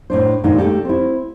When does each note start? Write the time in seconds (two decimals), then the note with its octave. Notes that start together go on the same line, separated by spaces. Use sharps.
0.10 A2 D4 C5
0.44 G2 A#2 D#3 G#3 D4 D#4
0.58 A3 G4 A4
0.85 C4 E4